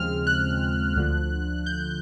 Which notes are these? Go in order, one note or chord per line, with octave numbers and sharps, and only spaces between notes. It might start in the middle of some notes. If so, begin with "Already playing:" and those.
Already playing: D#2 C#3 F3 G#3 C4 F6
F#6
D2 D3 F3
G6